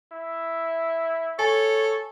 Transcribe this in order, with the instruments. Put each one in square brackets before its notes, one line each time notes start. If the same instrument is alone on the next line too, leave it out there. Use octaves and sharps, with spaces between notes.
[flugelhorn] E4
[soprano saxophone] A4 [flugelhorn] C#5 [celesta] G#5